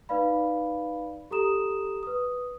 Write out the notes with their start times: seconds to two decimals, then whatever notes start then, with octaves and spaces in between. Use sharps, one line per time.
0.09 D#4 B4 D5 F5 B5
1.31 G4 A4 A#5 D#6 E7
2.03 B4 D#6